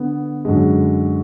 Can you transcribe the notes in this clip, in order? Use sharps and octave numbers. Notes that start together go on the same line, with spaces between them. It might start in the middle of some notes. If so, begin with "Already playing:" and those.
Already playing: D3 B3
F#2 D3 G#3